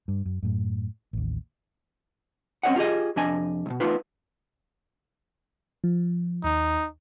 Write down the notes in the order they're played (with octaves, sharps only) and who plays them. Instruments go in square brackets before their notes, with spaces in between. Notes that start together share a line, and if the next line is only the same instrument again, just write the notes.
[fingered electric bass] G2
F#2
F#2 A2
A1 D#2
[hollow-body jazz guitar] C4 C#4 G4 C#5 D#5 F#5
F4 G4 G#4 D#5
F2 C3 D4 D#5 G#5
C2 B2
A3 B3 D#4 F4 B4
[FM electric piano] F3
[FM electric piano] D#2 [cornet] D#4